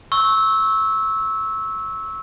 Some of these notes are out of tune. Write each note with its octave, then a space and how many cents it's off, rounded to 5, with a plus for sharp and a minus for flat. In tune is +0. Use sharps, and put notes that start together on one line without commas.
C#6 -15 E6 -15